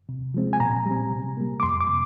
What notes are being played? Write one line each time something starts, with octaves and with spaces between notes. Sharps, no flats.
C3
F3 G#3 C4
G#5
A#2 A#5
G3
C4
C3
G3 A#3
D6
F2 C6
D6
C3